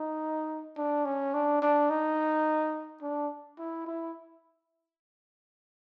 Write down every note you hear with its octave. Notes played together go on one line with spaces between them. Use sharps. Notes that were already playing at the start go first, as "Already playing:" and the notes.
Already playing: D#4
D4
C#4
D4
D4
D#4
D4
E4
E4